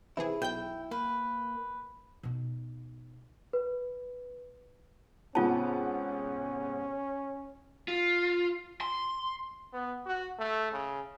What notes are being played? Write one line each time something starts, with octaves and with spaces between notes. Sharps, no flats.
C3 E3 E4 G#4
B1 G5 G6
A#3 B4
B2 D#4
B4
G#2 C3 B3 C#4 F4 A5
F4
C6
B3
F#4
A3
C#3